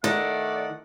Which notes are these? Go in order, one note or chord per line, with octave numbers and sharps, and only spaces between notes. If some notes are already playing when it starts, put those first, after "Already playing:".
D#3 A3 D5 F#5